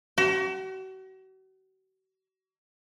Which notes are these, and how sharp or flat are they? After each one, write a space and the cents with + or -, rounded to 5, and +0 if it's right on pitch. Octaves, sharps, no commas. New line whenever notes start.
F#4 +40